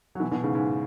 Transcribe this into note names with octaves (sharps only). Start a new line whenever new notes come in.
F#3
B2 E3
B2 E3
G#2 C#3
G#2